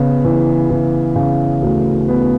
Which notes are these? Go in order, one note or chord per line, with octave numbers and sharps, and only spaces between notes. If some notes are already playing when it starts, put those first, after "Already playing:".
Already playing: C#3 B3
E3
E3
C#3
D2
B3